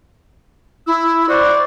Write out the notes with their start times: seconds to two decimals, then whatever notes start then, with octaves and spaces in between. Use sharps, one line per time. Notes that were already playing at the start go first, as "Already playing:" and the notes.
0.87 E4 E6
1.29 F#4 C5 D5